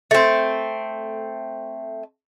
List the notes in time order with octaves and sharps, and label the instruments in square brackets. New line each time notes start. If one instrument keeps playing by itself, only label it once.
[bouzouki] A3 C4